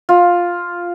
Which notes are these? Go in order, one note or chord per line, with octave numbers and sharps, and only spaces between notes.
F4